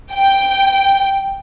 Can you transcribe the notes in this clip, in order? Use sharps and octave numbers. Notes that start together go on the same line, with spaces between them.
G5